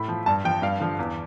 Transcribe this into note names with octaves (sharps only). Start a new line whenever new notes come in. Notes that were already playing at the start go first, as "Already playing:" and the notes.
Already playing: A2 B5
F3
G2 A5
F3 G5
G2 F5
D3 F3
E2